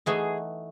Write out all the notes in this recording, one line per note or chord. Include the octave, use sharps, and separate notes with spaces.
E3 A3 D#4 F#4 G#4